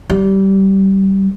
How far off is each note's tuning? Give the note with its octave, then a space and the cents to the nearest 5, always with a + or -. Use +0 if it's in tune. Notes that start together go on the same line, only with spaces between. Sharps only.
G3 -20